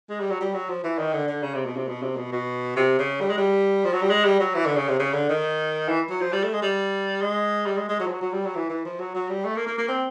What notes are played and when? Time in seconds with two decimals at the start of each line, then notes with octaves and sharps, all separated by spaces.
0.09 G#3
0.20 G3
0.30 F#3
0.41 G3
0.54 F#3
0.69 F3
0.84 E3
0.98 D#3
1.13 D3
1.28 D3
1.43 C#3
1.54 C3
1.66 B2
1.76 C3
1.88 B2
2.02 C3
2.17 B2
2.32 B2
2.76 C3
2.99 C#3
3.21 G3
3.30 G#3
3.38 G3
3.85 F3
3.93 F#3
4.02 G3
4.10 G#3
4.25 G3
4.40 F#3
4.55 E3
4.66 D3
4.76 C#3
4.88 C3
4.99 C#3
5.13 D3
5.29 D#3
5.88 E3
6.10 F#3
6.21 F3
6.32 G3
6.43 A3
6.54 G#3
6.62 G3
7.22 G#3
7.66 G3
7.77 G#3
7.89 G#3
8.00 F#3
8.06 F3
8.11 F#3
8.21 F#3
8.32 G3
8.45 F#3
8.55 E3
8.70 E3
8.85 F3
8.99 F#3
9.15 F#3
9.29 G3
9.45 A3
9.56 A#3
9.67 A#3
9.78 A#3
9.88 C4